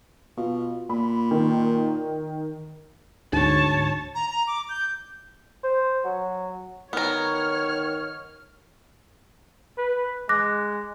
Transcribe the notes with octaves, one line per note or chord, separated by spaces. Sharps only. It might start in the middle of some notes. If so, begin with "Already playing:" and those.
B2 F4
A#2 B5
D#3
D2 G#2 C#5 A5
A#5
A#5
D6
G6
C5
F#3
D#3 B3 A#4 C#5 F6
B4
G#3 D6 F#6 A#6